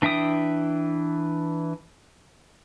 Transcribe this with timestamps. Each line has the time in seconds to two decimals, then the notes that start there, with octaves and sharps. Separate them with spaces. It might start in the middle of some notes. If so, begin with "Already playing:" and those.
0.02 E3 D4 E5 G5 D#6